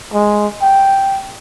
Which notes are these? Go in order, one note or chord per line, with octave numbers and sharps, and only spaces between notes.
G#3
G5